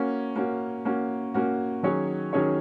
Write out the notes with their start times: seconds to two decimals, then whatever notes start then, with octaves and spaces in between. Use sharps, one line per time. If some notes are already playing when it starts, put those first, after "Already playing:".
Already playing: A#3 C#4 F#4
0.36 A#3 C#4 F#4
0.85 A#3 C#4 F#4
1.34 A#3 C#4 F#4
1.83 D#3 F#3 C#4 G#4 C#5
2.33 D#3 F#3 C#4 G#4 C#5